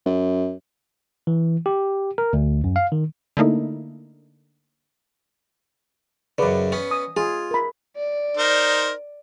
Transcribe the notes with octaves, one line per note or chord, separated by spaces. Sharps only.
F#2
E3
G4
A#4
D2
F#2
F5
D#3
D3 A3 A#3 D#4 E4
F#2 C#3 B4 D5
B3 C#4
D#6
F4 G#4
A#4 B5
D5
D#4 A#4 C5